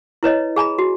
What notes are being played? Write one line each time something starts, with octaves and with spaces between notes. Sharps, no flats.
E4 B4 C#5 D#5
G#4 G#5 A#5 B5
F#4